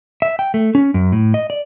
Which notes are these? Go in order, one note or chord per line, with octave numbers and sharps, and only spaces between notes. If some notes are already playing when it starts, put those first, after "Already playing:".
E5
G5
A3
C#4
F#2
A2
D#5
D5